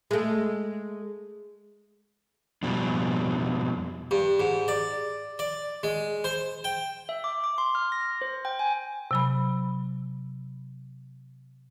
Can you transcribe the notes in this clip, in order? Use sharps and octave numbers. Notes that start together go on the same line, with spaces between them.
G#3 A3
F2 B2 G3
G2
G#2
D5
D5
G#3
C5
G5
E5
D6
D6
C6
F6
A#6
C5
G5
G#5
C3 F#3 B5